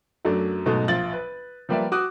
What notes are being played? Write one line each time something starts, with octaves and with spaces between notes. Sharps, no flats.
F#2 F#3 A3 D4
G#2 B2 F#3 G#3 A3
A#1 F4 A6 F#7
B4
F3 G3 A#3 B4 D5 E5
F#4 D6 D#6 F#6